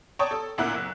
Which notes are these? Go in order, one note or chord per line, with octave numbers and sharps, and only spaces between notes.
C#5 D5 G5 A5 C#6 D#6
A4
D2 A#2 E4 F#5 E6 F#6
F#1